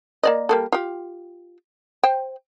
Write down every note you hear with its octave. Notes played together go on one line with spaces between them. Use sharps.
A#3 D5 D#5
G3 A#3 A4
F4 G4
C5 G5